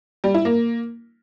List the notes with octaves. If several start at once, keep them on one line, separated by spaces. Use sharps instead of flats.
G3
E4
A#3